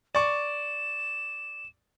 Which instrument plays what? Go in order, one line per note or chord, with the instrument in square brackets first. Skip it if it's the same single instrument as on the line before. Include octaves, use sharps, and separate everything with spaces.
[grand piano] D5 C#6 [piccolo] E7